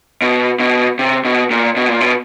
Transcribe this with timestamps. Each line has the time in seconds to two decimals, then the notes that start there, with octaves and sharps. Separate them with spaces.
0.22 B2
0.60 B2
0.99 C3
1.25 B2
1.51 A#2
1.76 B2
1.88 A#2
2.01 B2